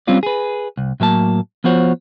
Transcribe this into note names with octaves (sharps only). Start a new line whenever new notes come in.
G3 C4 C#4 F4 D5
G#4 B4
C2
A2 F#3 A#3 A5
F3 B3 F4 F#4 C5 C#5